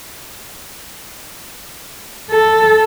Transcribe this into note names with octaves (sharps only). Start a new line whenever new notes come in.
A4